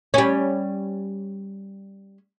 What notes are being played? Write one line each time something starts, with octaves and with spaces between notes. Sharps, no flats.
G3 C#4